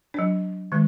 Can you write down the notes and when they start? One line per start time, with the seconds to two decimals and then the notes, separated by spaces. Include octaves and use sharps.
0.14 F#3 D4
0.72 D#3 G#3